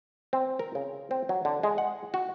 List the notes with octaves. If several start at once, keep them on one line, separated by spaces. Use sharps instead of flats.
C4
A#4
C#3
C4
F#3
D3
G#3
F#5
F#4